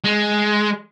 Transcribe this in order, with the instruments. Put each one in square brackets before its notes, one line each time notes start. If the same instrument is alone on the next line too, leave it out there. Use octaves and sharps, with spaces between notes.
[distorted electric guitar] G#3